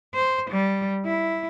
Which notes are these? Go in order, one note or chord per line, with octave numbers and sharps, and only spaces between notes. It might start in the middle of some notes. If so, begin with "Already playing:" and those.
C5
G3
E4